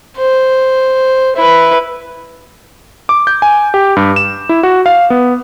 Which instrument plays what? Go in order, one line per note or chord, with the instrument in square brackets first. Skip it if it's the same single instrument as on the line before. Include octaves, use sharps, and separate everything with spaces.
[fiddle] C5
E4 B4
[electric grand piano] D6
G6
G#5
G4
G2
E7
E4
F#4
F5
B3